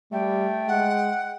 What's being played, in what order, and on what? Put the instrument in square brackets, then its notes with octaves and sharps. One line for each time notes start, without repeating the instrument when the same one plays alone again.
[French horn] G3 [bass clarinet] A3 [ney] G5
[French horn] G#3 [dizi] F#5